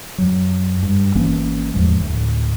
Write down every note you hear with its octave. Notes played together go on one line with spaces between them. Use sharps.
F#2 F#3
G2
G#1 E3 A#3 C#4
E2 A2 F3 G#3
D2 A2